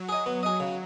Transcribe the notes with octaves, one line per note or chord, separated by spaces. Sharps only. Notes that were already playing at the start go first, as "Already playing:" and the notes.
Already playing: F#3
G#4 D#5
B3
G#4 D#5
C#3